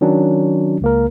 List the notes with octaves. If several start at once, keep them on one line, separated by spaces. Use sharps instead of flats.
D#3 F#3 C#4 D4
C#2 A#3 A#4